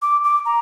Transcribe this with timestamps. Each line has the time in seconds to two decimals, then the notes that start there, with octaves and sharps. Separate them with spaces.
0.02 D6
0.24 D6
0.45 A#5